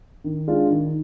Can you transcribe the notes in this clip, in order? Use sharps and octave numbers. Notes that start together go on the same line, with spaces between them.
D#3
G#3 D4 F4
D#3